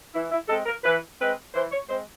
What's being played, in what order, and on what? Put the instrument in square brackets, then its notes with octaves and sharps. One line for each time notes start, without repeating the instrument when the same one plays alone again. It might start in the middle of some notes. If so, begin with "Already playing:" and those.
[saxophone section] E3 E4
E4
G#3 C4 A4
A#4
E3 B4
G#3 C4 B4
E3 C5
C#5
G#3 C4 C5